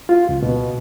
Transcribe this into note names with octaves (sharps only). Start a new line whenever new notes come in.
F4
C#2
B2